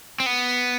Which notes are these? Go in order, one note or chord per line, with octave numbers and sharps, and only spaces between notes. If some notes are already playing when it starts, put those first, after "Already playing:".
C4
B3